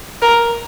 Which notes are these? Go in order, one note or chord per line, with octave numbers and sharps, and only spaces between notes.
A#4